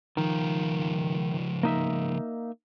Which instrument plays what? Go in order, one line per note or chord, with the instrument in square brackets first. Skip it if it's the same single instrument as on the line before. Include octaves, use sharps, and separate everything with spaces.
[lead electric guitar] C#2 F3 [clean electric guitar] D#3
[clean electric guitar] A#3 D#4 E5